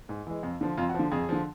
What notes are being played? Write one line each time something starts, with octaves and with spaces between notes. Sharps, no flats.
G#2
E3 G#3
F2
D3 F3
F2 F4
F#4
D3 F3
F2 G#4
D3 F3